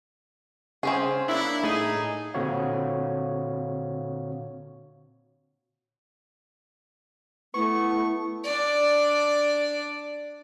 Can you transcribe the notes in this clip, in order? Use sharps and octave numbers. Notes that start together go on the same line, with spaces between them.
C#3 C4 C#4 G#4
A#3 D4 E4
A2 D#4 G#4 A4
A#2 D3 C4 F#4 C#5 F5
A3 B3 E4 C#6
D4 D5